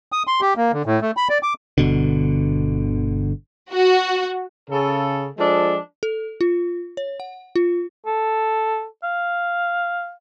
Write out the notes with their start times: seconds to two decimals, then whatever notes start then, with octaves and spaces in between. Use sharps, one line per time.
0.12 D#6
0.27 C6
0.41 G4
0.57 A#3
0.73 D3
0.86 A2
1.01 A3
1.17 B5
1.29 D5
1.43 D6
1.78 G1 B2 D3
3.72 F#4
4.70 C#3 A4
5.38 F3 G#3 D4 A4
6.03 A4
6.41 F4
6.97 C#5
7.20 F#5
7.56 F4
8.06 A4
9.04 F5